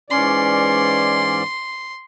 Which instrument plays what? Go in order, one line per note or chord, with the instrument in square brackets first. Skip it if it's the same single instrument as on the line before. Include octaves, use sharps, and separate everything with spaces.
[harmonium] G#2 E3 D5 [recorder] C#4 [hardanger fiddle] C6